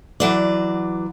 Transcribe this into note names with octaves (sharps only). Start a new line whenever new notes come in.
E3 F#3 D5